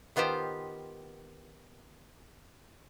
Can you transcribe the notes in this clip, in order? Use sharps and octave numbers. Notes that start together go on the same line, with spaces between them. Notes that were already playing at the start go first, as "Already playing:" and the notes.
D#3 B3 F4 G4 C5